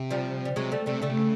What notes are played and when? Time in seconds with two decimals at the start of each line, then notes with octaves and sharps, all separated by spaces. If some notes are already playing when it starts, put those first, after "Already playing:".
Already playing: C3
0.11 F3 G3
0.45 G3
0.56 C3 F#3 G#3
0.72 G3 A3
0.86 C3 G3 A3
1.02 C#3 G3 A3
1.09 C3
1.19 C#3